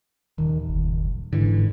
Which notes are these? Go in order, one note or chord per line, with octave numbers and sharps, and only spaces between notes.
D#1 D#3
F#1
G#2 D3 E3